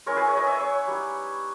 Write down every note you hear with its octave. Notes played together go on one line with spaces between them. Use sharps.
G#3 C#4 E4 A#4 C#5
G#4 B4
A#4 C#5
B4 D#5
C#5 E5
C#5 E5
G3 B3 D#4